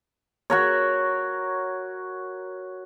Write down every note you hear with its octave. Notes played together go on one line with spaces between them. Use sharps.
F#4 A#4 C#5